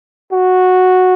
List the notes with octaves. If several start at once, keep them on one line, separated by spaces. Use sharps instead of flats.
F#4